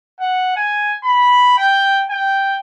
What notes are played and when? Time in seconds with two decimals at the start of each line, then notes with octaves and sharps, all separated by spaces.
0.20 F#5
0.56 G#5
1.04 B5
1.58 G5
2.10 G5